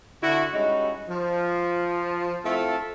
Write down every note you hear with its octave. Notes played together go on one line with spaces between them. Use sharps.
D3 E4 F#4
G3 G#3 C#4 D#4 E4 F#4
F3
A3 C4 E4 F4 A4